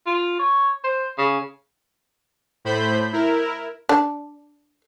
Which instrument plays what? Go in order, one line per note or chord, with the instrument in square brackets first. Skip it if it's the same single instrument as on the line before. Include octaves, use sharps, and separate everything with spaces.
[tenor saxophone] F4
C#5
C5
C#3
[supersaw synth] A2 C5 B5 G6
E4 A#4
[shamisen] D4